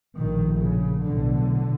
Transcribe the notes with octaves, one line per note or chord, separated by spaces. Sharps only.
A#1 A2 D#3
C#3
B1 A2 D3